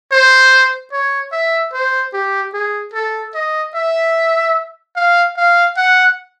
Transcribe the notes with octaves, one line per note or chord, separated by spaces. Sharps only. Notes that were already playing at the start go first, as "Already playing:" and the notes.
C5
C#5
E5
C5
G4
G#4
A4
D#5
E5
F5
F5
F#5